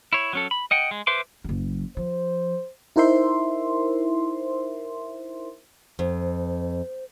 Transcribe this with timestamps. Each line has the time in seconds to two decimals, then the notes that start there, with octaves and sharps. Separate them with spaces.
0.13 E4 C#5
0.33 F#3 C#4 A4
0.51 B5
0.71 D#5 F#5 G5
0.91 G#3
1.07 B4 C5 E5 C6 D6
1.44 F#1 F#3
1.97 F3 C5
2.96 D#4 E4 A#4 C5 E5 C6
5.99 F2 C5